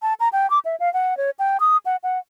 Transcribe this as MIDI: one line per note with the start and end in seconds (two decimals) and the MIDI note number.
0.02 0.14 81
0.20 0.29 82
0.33 0.49 79
0.50 0.59 86
0.65 0.76 76
0.80 0.92 77
0.94 1.17 78
1.17 1.30 73
1.39 1.57 79
1.60 1.77 87
1.86 1.96 78
2.03 2.19 78